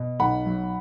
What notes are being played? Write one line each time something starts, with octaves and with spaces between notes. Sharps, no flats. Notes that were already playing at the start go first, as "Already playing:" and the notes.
Already playing: B2
B1 F#5 B5
F#3